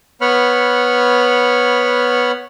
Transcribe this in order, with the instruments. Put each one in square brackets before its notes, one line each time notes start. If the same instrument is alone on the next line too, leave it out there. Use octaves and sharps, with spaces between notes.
[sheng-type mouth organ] B3 C#5 F#5 B5 F6